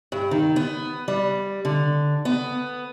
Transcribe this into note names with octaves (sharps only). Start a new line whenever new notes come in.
G2
D#3
B3
G3
D3
B3